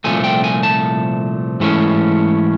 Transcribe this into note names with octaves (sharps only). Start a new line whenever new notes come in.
C2 A#2 F3 A3 G#5
G5
G#5
A5
G#2 E3 A3 C#4